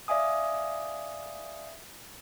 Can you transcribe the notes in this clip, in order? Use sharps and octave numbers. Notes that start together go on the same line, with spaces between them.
D5 E5 F5 G#5 D#6